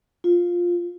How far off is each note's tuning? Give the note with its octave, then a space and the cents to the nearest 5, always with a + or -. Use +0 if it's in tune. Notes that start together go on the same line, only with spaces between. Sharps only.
F4 +5